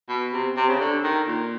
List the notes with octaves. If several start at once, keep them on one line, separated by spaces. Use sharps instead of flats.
B2
C3
C3
C#3
D3
D#3
A#2